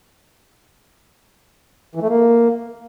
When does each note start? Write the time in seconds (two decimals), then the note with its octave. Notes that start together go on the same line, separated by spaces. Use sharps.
1.95 E3
2.02 A3
2.09 A#3